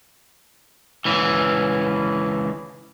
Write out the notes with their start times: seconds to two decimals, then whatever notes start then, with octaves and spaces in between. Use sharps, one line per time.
1.05 C#2 E3